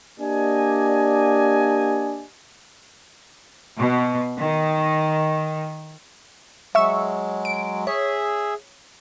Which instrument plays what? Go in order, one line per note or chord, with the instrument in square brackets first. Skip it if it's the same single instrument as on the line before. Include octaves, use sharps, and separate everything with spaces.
[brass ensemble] A#3 D4 G4 D5 D#5 G#5
[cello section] B2
D#3
[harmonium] F#3 G#3 [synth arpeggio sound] E5 C#6 E6
[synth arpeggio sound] D7
[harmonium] G#4 E5 [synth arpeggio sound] C#5